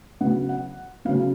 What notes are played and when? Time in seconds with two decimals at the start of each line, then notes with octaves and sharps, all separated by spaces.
0.21 C#3 F#3 B3 F#5
0.49 F#5
1.05 C#3 F#3 B3 F5